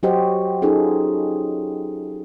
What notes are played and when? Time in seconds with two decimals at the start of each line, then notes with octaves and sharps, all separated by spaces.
0.03 F#3 F#4 G4 C5 D#5
0.62 C#4 D#4 F4 G#4 A4